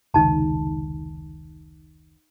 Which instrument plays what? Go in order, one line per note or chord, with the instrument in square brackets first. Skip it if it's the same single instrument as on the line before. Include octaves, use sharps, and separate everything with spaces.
[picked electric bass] F1 C#2 D#3 [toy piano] D#4 A5